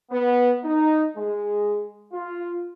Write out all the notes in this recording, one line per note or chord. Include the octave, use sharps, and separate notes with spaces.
B3
D#4
G#3
F4